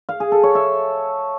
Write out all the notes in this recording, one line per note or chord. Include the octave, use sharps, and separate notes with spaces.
F5
G#4
A4
C#5
E5